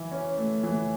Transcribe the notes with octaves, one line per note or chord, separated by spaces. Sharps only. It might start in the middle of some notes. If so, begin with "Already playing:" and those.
Already playing: E3 E4
C#4
A3
E3